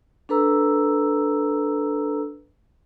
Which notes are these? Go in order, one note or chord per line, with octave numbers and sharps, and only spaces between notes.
D4 A4 B4 A#5 E6